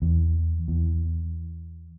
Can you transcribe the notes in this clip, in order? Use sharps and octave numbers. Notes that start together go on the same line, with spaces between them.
E2
E2